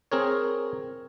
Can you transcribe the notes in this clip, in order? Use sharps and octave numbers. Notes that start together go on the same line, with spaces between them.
C4 G#4 A#4 C#5